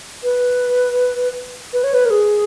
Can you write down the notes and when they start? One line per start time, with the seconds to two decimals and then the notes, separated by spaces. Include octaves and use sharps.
0.24 B4
1.73 B4
1.84 C#5
1.94 B4
2.05 A#4
2.10 G#4